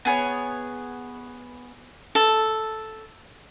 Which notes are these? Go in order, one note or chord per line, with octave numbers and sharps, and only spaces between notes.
B3 G#4 C#5
A4